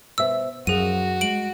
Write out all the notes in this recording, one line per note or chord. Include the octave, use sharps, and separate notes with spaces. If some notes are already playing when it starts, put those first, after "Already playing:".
B2 C5 E5 E6
F#2 F3 F#4 G#4 D#7
G#3 D7 F#7